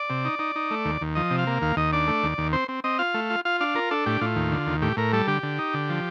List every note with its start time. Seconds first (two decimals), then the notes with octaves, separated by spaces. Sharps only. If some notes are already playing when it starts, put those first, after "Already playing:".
Already playing: D5
0.10 C3
0.25 D#4
0.39 D#4
0.56 D#4
0.71 A3
0.85 D#2
1.01 D#2
1.15 F3 D#5
1.31 C3
1.39 F5
1.47 A#3
1.62 D#2 F5
1.76 D#2 D#5
1.93 D4 D5
2.08 A3
2.23 D#2
2.38 D#2
2.53 C4 C5
2.68 C4
2.84 C4 D#5
2.99 F4 F5
3.14 A3
3.30 F4
3.45 F4 F5
3.61 D4 F5
3.75 F4 A#4
3.91 D4 A4
4.06 A2 G4
4.21 A2 F4
4.36 D#2
4.52 D3
4.67 D#2
4.82 A2 G4
4.97 A2 A#4
5.13 G3 A4
5.27 D3 G4
5.43 D3
5.58 D#4
5.74 D3
5.89 F3